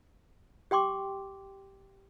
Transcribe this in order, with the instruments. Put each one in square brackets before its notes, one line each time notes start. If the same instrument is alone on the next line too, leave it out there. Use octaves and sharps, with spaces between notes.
[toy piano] G4 G5 C6 D6